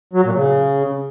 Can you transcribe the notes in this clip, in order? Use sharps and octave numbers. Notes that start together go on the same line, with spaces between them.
F#3
A#2
C#3